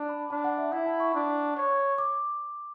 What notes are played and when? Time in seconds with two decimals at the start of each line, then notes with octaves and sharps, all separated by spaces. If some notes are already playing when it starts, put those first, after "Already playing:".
Already playing: D4
0.09 B5
0.30 D4 A5
0.44 F#5
0.58 E5
0.72 E4 F#5
0.86 A5
1.00 C#6
1.15 D4
1.57 C#5
1.98 D6